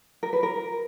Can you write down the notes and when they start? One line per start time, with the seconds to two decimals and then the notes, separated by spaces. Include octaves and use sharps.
0.23 A#4
0.33 B4
0.43 A#4